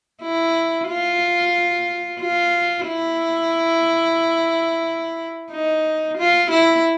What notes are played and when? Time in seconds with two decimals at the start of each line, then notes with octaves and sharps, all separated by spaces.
0.22 E4
0.88 F4
2.20 F4
2.87 E4
5.51 D#4
6.18 F4
6.51 E4